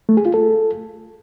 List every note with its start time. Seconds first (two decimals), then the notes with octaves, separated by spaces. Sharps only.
0.09 A3
0.17 G#4
0.25 F4
0.34 A4